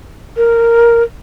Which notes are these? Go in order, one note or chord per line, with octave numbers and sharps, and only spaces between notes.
A#4